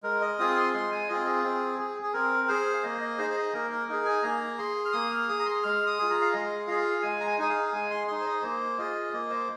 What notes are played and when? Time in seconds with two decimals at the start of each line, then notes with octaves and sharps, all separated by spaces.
0.03 G#3 A#4
0.21 D#5
0.39 C4 F4 G#4 D#6
0.57 C6
0.73 G#3 C6
0.92 G#5
1.08 C4 F4 G#4 D#5
1.26 G#4
1.43 C4
1.79 G#4
2.02 G#4
2.13 C4 A#4
2.48 G#4 C5
2.74 F5
2.83 A#3 D#5
3.01 D#5
3.18 D#4 G#4 C5
3.30 C5
3.36 D#5
3.54 A#3 A#4
3.71 A#4
3.88 D#4 G#4 A#4
4.05 G#5
4.23 A#3 A#5
4.58 G#4 C6
4.85 F6
4.93 A#3 D#6
5.10 F6
5.28 G#4 D#6
5.39 A#5
5.46 C6
5.63 G#3 F6
5.87 D#6
5.99 F4 G#4
6.10 A#5
6.22 F5
6.32 G#3 D#5
6.67 F4 G#4 F5
7.02 G#3 G#5
7.20 A#5
7.27 G#5
7.38 D#4 G#4 G#5
7.50 F5
7.72 G#3 G#5
7.91 C6
8.07 D#4 G#4 C6
8.21 C5
8.25 D#5
8.42 A#3 C5
8.78 F4 G#4 D#5
9.13 A#3 D#5
9.30 C5